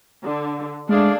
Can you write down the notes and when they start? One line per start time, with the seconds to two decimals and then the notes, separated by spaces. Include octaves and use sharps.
0.24 D3
0.89 G#3 A3 D4 G#4 D5 F5